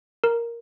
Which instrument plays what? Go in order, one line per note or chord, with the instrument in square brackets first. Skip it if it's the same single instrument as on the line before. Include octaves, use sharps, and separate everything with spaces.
[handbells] A#4